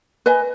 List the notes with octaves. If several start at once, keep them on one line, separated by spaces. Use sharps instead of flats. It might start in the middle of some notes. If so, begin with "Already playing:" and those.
B4 D#5 G#5